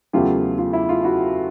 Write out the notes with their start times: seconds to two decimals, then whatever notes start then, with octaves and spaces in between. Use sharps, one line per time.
0.13 E2 C#3 F#3 A3 F4 G4
0.58 F4
0.73 E4
0.89 F4
1.04 E4 F#4